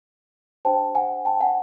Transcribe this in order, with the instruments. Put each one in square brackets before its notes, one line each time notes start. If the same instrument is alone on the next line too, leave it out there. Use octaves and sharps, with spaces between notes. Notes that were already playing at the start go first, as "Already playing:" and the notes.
[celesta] D4 G4 C5 G5 A5
F#5 G#5
G5 A5
F#5 G#5